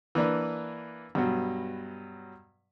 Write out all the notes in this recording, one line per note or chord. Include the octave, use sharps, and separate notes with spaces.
E3 A#3 D4 B4
G2 B2 F#3